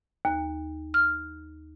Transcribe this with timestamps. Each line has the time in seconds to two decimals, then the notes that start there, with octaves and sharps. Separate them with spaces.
0.25 D#2
0.94 F6